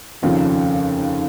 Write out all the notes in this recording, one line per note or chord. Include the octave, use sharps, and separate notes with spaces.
F1 D#2 C#3 F3